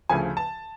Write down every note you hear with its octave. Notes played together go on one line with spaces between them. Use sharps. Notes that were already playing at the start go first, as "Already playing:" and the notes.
D2 C#3 F3 G#5
A5